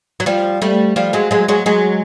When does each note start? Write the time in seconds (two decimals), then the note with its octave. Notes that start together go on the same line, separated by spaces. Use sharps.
0.20 F#3
0.26 F3 G3
0.62 G3 A3
0.96 F3 G3
1.13 F#3 G#3
1.31 F#3 G#3
1.48 F#3 G#3
1.66 F#3 G#3